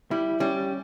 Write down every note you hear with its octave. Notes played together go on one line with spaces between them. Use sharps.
G3 E4
G3 C#4